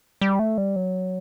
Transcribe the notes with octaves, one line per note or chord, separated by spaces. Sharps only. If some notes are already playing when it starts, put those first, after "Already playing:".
G3
A3
G3
F#3